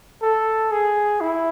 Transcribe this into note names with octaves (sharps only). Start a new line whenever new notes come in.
A4
G#4
E4